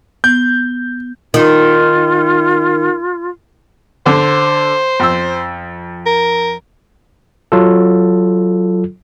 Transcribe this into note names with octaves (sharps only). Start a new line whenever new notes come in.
B3 G6
D#3 F4
D3 C5
F2 E6
A#4
F#3 F4 A4